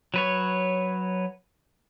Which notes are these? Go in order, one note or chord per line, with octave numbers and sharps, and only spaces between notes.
F#3 B4 C#5